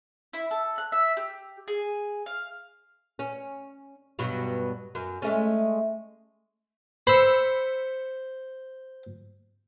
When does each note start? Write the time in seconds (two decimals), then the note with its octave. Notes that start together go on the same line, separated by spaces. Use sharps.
0.33 E4
0.51 A4
0.78 F#6
0.92 E5
1.17 G4
1.68 G#4
2.26 F5
3.19 C#4
4.19 G2 B2 F#3
4.95 F#2
5.22 G#3 A3 C#4
7.07 C5 B5 E6 C#7